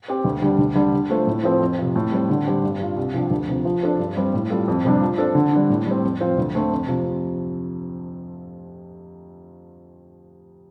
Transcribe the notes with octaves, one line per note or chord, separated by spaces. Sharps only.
C4 G4 C5
D2
D3 G3 D4 G4
D2
D3 G3
D3
A3 F4 A4 C5
A2
F3 C4 A4 C5
F2
C3 F3
A2
G3 C4
D3
G3 C4 G4
G2
G3 F4
C2
C3 F3 D4 G4
D2
C3 F3
F3
D4 A4 C5
G2
G3 C4
A2
G3 F4 A4
F2
C3 G3 D4
F3
D4 A4 C5
D3
G3 D4
A2
G3 C4
F2
F3 C4 F4 C5
D2
D3 A3 C4
F2
C3 F3